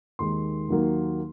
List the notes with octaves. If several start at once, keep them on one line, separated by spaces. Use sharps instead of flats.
D#2 D#3 G#3 C6
D#2 D#3 F#3 A#3